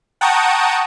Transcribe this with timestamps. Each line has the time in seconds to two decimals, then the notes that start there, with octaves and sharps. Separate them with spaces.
0.21 F#5 G5 A5 A#5 C#6 D#6